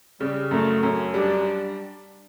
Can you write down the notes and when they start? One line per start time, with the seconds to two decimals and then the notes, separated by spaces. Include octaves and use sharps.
0.20 C#3 G3
0.51 F#2 A3
0.83 F#2 C#4
1.14 G3 D4